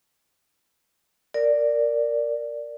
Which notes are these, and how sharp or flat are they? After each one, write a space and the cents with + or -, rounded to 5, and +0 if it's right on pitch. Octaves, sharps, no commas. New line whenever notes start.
A#4 -10 D5 +0